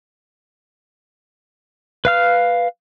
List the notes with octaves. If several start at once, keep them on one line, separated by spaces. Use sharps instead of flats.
B4 F5 F6